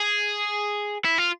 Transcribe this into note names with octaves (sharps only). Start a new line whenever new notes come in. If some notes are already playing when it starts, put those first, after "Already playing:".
Already playing: G#4
E4
F4